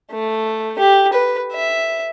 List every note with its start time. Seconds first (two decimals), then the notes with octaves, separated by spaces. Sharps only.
0.11 A3
0.79 G4
1.13 B4
1.53 E5